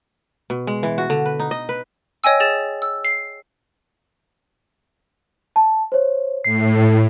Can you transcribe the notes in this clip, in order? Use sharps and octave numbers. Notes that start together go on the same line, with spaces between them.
B2
G#3
E3
F#4
D3
B4
D#4
D#5
B4
C#5 D#5 G5 G#5 E6
G#4 A6 E7
E6
C7
A5
C5 C#5
A2 C7